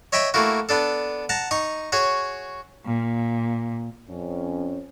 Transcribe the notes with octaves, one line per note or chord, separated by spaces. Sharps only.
C#5 D#5 E5 G5 B5
A3 A#3 E4 F#4
B3 D4 A4
F#5 A5 A#5
D#4 C#6 D#6
F#4 G#4 C#5
A#2
F2 C#4